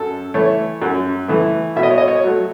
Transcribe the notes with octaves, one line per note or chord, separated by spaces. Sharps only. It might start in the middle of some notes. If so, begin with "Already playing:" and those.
Already playing: F#2 A4
E3 A3 C#5
F#2
E3 A3
B2 E5
D#5
C#5
D#5
C#5
F#3 A3